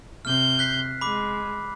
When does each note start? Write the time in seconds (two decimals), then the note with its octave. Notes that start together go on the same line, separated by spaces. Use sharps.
0.25 C3 F6 G6
0.59 F#6 B6 C7
1.01 G#3 B5 D6